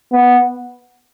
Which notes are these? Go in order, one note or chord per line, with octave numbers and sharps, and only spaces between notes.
B3